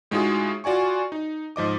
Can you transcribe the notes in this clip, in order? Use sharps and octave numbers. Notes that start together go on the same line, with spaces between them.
A2 G#3 D#4 F4 F#4 G#4
F4 F#4 D5 G#5 C#6
D#4
G#2 F3 D#5 D6